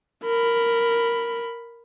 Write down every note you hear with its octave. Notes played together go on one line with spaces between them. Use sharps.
A#4 B5